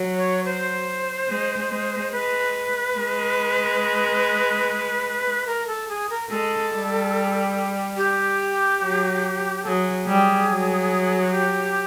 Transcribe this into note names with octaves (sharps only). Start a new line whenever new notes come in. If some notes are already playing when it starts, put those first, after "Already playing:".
Already playing: F#3
C#5
C5
G#3
G#3
G#3 B4
G#3
A#4
A4
G#4
A#4
G#3 A4
G3
G4
F#3
F#3 G#4 A4
G3
F#3
G4